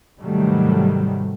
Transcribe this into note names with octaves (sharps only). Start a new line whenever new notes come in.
G#2 C3 D#3 F#3 G3 A3